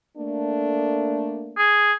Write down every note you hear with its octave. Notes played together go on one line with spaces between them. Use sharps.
A3 A#3 D4
G#4